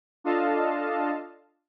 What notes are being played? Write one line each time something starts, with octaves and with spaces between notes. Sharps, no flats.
D4 F4 A4 D#5 F5 A5